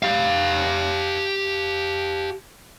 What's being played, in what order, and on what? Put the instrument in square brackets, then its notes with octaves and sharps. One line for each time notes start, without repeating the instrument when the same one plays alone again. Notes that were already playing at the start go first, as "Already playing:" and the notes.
[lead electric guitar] G4 F5